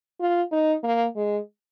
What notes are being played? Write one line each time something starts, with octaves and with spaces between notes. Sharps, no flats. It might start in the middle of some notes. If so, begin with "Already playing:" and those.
F4
D#4
A#3
G#3